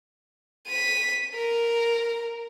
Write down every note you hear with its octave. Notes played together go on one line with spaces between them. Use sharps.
B6 D#7
A#4